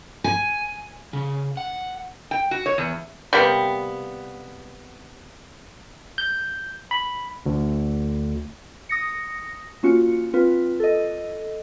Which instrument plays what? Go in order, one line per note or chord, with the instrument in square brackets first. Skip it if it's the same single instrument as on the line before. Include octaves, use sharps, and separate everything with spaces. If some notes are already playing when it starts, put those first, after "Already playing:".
[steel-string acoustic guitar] G#5
[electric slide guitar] C#3
F#5
[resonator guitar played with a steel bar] G5
F#4
C#5
E2
[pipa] C3 G3 A#3 B3
[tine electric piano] G6
B5
D2
[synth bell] D#6 A#6 C#7
A#3 C#4 F4 F#4 C#7
C4 F4 B4
A4 D#5